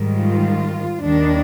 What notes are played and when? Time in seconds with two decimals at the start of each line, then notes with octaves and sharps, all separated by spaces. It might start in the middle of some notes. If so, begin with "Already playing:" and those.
Already playing: G#2 D#3 G3
0.17 F4
1.02 D#2 D#3 G3 D4